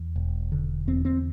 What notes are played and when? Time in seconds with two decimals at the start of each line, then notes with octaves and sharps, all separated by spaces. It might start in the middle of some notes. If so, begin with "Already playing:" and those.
Already playing: E2
0.16 E1
0.52 D3
0.87 E2 C4
1.05 C4